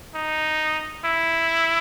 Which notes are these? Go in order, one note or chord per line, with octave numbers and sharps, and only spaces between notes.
D#4
E4